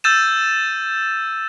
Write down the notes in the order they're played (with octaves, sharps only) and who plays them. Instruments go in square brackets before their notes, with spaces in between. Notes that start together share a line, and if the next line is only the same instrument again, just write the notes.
[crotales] E6 G6 A6 D#7 E7